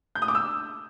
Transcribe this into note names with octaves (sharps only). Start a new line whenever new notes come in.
G6
D#6
D6
E6